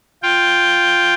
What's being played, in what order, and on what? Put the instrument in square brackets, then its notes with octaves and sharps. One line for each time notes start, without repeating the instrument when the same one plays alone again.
[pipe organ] F4 G5